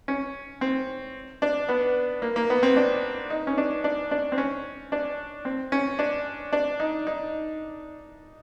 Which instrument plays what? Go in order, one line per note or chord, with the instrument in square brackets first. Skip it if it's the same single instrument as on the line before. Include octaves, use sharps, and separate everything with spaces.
[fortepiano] C#4
C4
D4
B3
A#3
A#3
B3
C4
D4
D#4
C#4
D4
D4
D4
C4
C#4
D4
C4
C#4
D4
D4
D#4
D#4